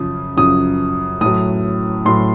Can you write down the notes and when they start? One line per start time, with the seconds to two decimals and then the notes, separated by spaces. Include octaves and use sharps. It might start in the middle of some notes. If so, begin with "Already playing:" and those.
Already playing: F#2 C#3 F3 D#6
0.37 F#2 C#3 F3 D#6
1.21 A2 F#3 D#6
2.05 A2 F#3 C6